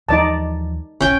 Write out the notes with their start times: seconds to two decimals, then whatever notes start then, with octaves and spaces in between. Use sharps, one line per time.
0.09 D#2 E3 F3 D#4 D5 A5
1.01 F1 B1 C#4 G5